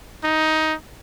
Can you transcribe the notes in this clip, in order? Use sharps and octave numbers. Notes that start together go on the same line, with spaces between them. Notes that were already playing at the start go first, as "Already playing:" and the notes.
D#4